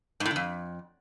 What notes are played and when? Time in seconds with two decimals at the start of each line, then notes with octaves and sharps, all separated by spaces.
0.20 G#2
0.25 A2
0.31 D3
0.36 F2